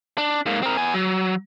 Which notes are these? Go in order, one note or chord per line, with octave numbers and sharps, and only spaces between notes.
D4
G#2 A#3
C4 A#4
B3 G#5
F#3